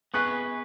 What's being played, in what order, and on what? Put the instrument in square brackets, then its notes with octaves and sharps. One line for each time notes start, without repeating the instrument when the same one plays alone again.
[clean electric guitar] B3 G#4 B4 [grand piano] C#6 F#6